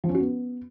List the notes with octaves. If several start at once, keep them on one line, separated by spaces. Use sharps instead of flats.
F3
C#4
F#4
B3